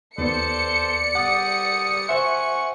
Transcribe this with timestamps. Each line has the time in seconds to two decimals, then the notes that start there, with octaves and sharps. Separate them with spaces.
0.18 D#2 B3 A4 C5 D5 C#7
1.15 G3 F#5 D#6
2.09 C5 E5 F#5 G#5 C#6